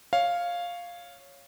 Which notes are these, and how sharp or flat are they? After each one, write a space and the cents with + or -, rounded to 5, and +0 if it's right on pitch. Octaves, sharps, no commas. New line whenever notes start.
C#5 +0 F5 +0